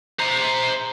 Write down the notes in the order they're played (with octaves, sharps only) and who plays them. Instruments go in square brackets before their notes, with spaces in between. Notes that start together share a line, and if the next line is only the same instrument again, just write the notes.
[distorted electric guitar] C5 A#5